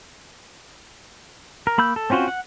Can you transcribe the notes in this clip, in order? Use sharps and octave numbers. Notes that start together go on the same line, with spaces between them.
A#4
A#3 B5 E6 G6
A4
C4 C#4 F4 F#4 C5
F#5